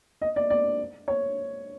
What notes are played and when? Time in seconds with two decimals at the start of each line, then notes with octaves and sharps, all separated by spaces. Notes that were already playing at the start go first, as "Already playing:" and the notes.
0.21 D#5
0.36 D5
0.50 D5
1.08 C#5